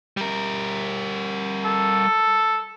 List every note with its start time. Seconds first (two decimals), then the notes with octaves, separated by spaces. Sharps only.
0.17 G3 A#4
1.65 A4